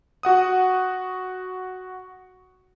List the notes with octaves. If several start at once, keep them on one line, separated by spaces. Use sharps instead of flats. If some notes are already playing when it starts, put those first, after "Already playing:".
F#4 F#5 D#6